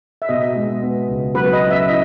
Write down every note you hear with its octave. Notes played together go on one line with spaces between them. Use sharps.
E5
B2 D#5
G#3
B3
C#2
F#3 B4
D#5
C#4
E5
E4 D#5